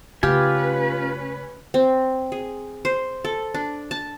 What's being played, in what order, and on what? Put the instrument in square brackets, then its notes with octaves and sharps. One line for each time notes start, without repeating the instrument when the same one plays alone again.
[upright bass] C#3 A3 [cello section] C#4 B4 [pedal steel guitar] F4 G#5 [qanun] G4
[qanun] C4
G#4
C5
A4
D4
A5